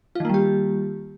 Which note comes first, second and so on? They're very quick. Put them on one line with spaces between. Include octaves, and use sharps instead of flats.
F4 D#3 A#3 G3 G4